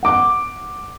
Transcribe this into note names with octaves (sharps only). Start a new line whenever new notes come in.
F#5 D6